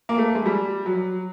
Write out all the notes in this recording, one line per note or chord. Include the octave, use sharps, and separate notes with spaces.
A#3
A3
G#3
G3
F#3